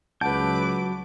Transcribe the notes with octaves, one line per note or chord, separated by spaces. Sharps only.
C#2 F#3 B4 F#5 A5 D6 G6